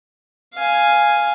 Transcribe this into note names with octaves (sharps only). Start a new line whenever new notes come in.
F5 G#5